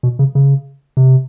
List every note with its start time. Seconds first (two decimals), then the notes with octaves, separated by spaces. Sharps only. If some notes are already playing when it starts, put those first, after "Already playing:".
0.03 B2
0.19 C#3
0.35 C#3
0.97 C3